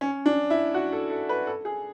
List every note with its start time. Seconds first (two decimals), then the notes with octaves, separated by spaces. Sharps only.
0.01 C#4
0.26 D4
0.50 E4
0.74 F#4
0.92 A4
1.10 A4
1.29 B4
1.47 A4
1.65 G#4